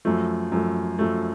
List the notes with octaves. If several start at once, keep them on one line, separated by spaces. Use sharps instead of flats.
F#2 F3 A3
F#2 F3 A3
F#2 F3 A3